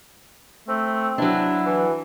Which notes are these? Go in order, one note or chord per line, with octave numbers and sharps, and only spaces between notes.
A3 C4
F#3 D4 E4
E3